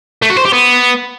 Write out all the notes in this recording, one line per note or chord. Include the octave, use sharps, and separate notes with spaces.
A3
F#4
C5
G4
B3